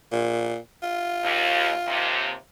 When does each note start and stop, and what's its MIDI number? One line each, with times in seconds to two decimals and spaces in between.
0.12 0.57 46
0.82 2.34 65
1.24 1.70 39
1.87 2.33 39
1.87 2.33 48